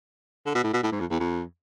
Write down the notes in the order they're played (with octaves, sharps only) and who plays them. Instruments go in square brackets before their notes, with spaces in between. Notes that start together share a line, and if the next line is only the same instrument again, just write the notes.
[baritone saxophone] D3
B2
A2
B2
A2
G#2
F2
E2
F2